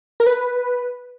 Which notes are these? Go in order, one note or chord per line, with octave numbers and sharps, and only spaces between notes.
A#4
B4